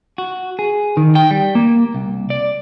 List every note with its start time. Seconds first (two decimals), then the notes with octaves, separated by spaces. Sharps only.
0.18 F#4
0.59 G#4
0.97 D#3
1.15 G5
1.31 G3
1.55 A#3
1.95 C2
2.30 D5